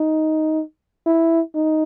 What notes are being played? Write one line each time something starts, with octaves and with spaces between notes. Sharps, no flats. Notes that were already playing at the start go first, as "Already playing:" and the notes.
Already playing: D#4
E4
D#4